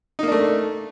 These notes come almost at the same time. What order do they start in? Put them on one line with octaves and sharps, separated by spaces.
D#4 A#3 D4 A3